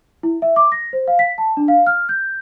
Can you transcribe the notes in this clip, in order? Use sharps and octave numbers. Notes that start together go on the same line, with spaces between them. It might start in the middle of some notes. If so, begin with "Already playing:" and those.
E4
E5
D6
A#6
C5
F5
B6
A5
D4
F5
F6
G6